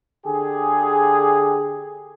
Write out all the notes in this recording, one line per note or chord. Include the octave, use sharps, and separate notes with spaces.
D3 G4 G#4